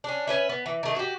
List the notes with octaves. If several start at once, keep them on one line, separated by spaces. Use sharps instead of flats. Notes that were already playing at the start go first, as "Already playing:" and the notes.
C#4 D4
C#4 B4 E5
B3
E3
D#3 A3
F#4 G4